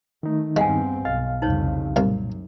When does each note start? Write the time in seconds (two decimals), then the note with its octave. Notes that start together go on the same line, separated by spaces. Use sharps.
0.23 D#3 A3 D#4
0.56 E2 G2 G#3 C4 F5 F#5 G#5
1.05 B1 D#5 F5
1.42 C2 F2 C#3 D#4 C5 C#5
1.96 C2 F#2 A#2 F5